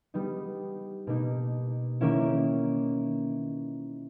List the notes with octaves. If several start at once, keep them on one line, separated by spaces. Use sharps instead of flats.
G3 B3 D#4
B2 A#3 D#4
D#3 A#3 C#4 E4